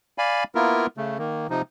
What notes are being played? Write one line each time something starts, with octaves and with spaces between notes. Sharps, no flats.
D5 F5 G#5 B5
A#3 B3 E4 F4 A#4
C#3 A3
D#3 A#3
C3 F3 D#4